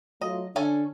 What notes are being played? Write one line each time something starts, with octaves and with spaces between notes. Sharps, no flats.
F#3 A3 F4 D#5
D3 C#4 D4 A4 G#5